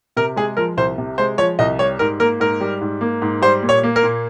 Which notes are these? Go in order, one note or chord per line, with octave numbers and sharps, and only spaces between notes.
C3 A#4
G#3 G#4
F3 A#4
C2 C5
C3
G#3 C5
F3 C#5
C2 D#5
G3 C#5
G#2 A#4
A#3 A#4
G#2 A#4
G3
G#2
A#3
G#2
G3 C5
A#2
C#5
A#3
A#4
A#2